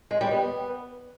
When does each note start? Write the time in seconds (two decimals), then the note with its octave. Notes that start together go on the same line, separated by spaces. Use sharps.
0.11 G#3
0.21 G3
0.31 B3